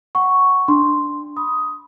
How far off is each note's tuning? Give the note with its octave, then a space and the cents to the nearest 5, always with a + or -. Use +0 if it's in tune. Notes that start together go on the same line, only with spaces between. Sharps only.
F#5 +5 C#6 +0
D4 +0 C6 +0
B5 -10 D#6 +10